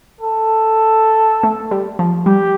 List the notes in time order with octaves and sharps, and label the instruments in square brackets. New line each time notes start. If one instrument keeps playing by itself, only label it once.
[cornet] A4
[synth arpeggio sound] A3
G3
F3
[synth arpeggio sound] G3 [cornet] G4